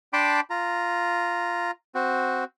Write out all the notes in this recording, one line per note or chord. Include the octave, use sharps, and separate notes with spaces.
D4 G5 A5 B5 C6 D6
F4 A#5
C4 F#4